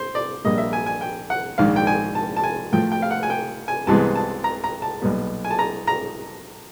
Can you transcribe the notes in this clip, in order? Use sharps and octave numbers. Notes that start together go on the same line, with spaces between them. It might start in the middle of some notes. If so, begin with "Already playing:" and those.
Already playing: C5
D5
A#1 A#2 G3 A#3 D#5
E5
G#5
G#5
G5
F#5
A#1 G#2 D#3 F5
G5
G#5
A5
A5
G#5
A2 F3 A3 G5
G5
F5
F#5
G#5
G5
G#5
C2 C3 E3 G#3 B3 A5
A5
A#5
A#5
A5
B1 A#2 G3 B3
G#5
A5
A#5
A#5